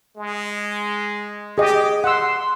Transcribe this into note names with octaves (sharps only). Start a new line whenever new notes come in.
G#3
G4 G#4 D#5
F#5 C6 E6